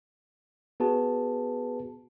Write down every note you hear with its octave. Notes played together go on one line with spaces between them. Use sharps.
B3 F#4 G#4 B4 A5